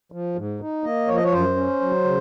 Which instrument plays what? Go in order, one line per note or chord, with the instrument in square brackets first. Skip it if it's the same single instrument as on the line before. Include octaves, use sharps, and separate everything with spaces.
[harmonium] F3
G#2
D#4
A#3 D#5
F3 C#5
D#5
C#5
F#2 C5
C#4
F#3
C#3